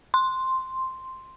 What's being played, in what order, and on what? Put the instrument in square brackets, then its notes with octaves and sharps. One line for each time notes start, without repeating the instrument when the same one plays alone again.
[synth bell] C6